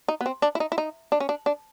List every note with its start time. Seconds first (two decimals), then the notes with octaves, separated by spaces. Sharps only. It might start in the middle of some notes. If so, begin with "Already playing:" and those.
0.08 D#4
0.21 B3
0.26 C4
0.42 D4
0.55 E4
0.60 D#4
0.72 E4
0.78 D#4
1.12 D4
1.20 C#4
1.29 D4
1.46 D4